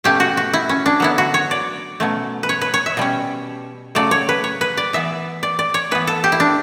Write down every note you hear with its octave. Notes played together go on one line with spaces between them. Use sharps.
B2 A3 C#4 G4
F#4
F#4
E4
C#4
D4
D3 F#3 B3 E4
F#4
C#5
D5
B2 F#3 A3 C#4
B4
C#5
B4
C#5
E5
B2 G3 C#4
C#3 F#3 A3 D5
C#5
B4
C#5
B4
D5
E3 B3 E5
D5
D5
C#5
E3 B3 B4
A4
G4
E4
D4